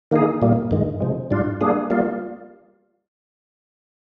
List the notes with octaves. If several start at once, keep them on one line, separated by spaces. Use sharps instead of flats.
D#3 A#3 D#4 G#4
A#2 G3 A#3
G2 D#3 G#3
C3 F3 G#3
G#2 G3 D4 F4
G3 A#3 D4 G#4
G3 A#3 F4